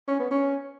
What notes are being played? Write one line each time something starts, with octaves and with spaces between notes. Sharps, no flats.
C#4
B3
C#4